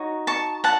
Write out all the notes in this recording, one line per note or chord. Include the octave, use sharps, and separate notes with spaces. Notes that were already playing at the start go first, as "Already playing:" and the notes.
Already playing: D#4 F#4 C#5
A5 C#6
F#5 A5